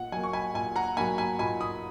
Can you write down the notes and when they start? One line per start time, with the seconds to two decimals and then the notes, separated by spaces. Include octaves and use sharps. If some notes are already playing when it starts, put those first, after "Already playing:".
Already playing: A#2 F#5
0.12 F#3 A#3 G#5
0.23 C#6
0.33 G#5 B5
0.54 A#2 G#5
0.76 F#5 A#5
0.97 F#3 A#3 G#5 B5
1.18 G#5 B5
1.39 A#2 G#5 B5
1.61 B5 D#6